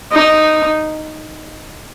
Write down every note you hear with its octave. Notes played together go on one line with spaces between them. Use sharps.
D#4